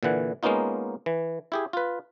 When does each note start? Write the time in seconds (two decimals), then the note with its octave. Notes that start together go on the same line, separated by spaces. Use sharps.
0.03 A#2 D3 E3 F#5
0.43 G#3 A#3 B3 C#4 D#4 F4
1.06 E3
1.52 E4 G4 G#4
1.73 F4 B4